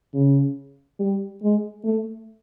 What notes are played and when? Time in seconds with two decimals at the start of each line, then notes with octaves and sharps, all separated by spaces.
0.14 C#3
1.00 G3
1.43 G#3
1.84 A3